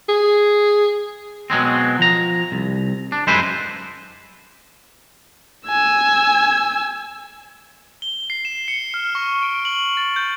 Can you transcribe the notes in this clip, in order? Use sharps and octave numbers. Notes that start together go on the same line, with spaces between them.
G#4
B2 F#3 G#3 C4
F3 A#5
C2
D4
F#2 G#3 D#4 E4 B4 C5
G#5 E6
G7
C7
E7
C#7
F6
C#6
D7
F#7
A6
G6